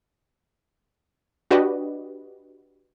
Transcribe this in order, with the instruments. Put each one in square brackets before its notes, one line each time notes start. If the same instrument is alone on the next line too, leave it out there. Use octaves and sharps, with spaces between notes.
[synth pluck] D4 F#4 G4 B4 D5 D#5